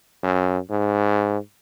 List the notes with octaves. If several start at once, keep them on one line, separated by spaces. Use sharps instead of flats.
F#2
G#2